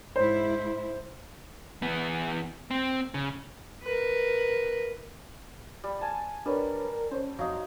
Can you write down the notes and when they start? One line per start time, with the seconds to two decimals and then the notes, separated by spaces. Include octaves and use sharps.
0.16 G#2 E4 C5
1.82 E2 B3
2.71 C4
3.14 C#3
3.83 A#4 B4
5.84 G3
6.01 G#5 A5
6.46 G3 D4 A#4 B4 C#5
7.11 C#4 C5 C#5
7.39 F2 F#3 D#4 F5